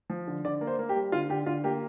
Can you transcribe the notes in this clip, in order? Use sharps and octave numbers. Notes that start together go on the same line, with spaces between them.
F3
D3
D3 D5
A#3
C5
A#3
G4
G3
D3 F4
D3 G4
D3 F4
A#3 G4